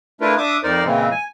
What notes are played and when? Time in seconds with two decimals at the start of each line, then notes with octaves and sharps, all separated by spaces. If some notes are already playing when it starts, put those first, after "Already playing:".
0.21 A3 D4 E4 F4 A#4 B4
0.38 D4 E5 D6 D#6
0.63 F2 D#4 A#4 C5 D5
0.84 A#2 C#3 E3 G#3 C4
1.11 G#5